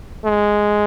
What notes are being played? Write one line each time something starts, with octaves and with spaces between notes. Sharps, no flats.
G#3